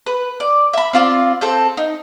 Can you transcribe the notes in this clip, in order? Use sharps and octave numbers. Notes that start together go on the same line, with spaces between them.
B4
D5
E5 B5
C4 F4 D5
C4 A4 G6
D#4